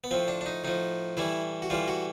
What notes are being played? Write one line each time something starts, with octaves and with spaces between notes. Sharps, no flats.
B3
A2 F3 C4
D4
D4
D#4
A2 F3 D#4
A2 E3 G3 E4
F#4
A2 E3 G3 F4
F#4